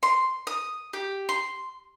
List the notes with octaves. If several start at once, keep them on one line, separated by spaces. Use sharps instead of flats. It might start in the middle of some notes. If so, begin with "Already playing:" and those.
C6
D#6
G4
C6